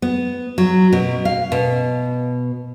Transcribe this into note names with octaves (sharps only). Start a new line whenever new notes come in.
B3
F#3
B2
F5
B2